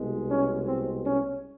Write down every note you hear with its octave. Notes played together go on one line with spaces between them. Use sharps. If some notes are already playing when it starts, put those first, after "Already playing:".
Already playing: C2 B2 G#3
C#4
C4
C#4